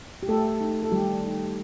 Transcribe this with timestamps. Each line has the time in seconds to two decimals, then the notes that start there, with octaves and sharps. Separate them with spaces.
0.23 G4
0.28 A3 A4
0.61 D#4
0.83 A4
0.92 D#3 G3 G4
1.24 D#4